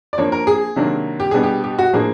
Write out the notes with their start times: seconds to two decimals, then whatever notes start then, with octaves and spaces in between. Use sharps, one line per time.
0.13 D5
0.18 F3 A#3 D4 C#5
0.32 A#4
0.47 G#4
0.76 C3 D#3 F#3 A#3 D4
1.20 G4
1.31 B2 G3 B3 D4 G#4
1.43 G4
1.64 G4
1.79 F#4
1.93 A2 F3 A#3 D4 G#4